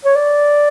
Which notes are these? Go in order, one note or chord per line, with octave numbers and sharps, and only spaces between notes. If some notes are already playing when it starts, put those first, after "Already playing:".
C#5
D5